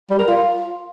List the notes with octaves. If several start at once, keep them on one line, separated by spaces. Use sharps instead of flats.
G3
A#4
F4